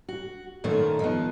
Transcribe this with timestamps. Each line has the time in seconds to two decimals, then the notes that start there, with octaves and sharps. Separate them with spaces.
0.08 F#4
0.64 F#2 A#2 D#3 A3 C#4
1.00 D#3 F3 B3